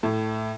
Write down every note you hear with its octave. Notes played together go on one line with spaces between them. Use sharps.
A2